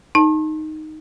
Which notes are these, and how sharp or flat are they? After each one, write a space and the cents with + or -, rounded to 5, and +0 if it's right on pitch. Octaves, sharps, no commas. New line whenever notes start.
D#4 +0 A5 +0